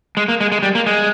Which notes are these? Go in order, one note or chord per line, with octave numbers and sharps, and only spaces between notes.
G#3
A#3
G#3
G#3
G3
A#3
G#3